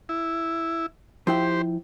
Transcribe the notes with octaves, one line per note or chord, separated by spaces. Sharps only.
E4
F3 E4 G4 C5 G5